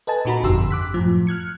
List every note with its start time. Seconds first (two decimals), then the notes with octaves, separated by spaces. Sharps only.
0.07 A4 B4 D#5 G#5 A5
0.25 A#2 A#3 D#4 F#4 A#5 B5
0.43 G1 F2 D3 G4 C6 E6
0.71 D6 F#6 B6
0.94 F#2 A2 F3
1.27 F6 F#6 G#6 C#7